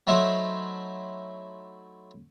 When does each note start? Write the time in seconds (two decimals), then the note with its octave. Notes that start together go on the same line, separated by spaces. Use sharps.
0.07 F#3 A3 D#4 E4 C5